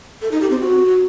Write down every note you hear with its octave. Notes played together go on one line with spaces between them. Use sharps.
A4
D#4
G4
C4
F#4